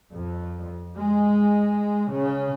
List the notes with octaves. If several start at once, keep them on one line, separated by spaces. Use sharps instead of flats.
F2
G#3
C#3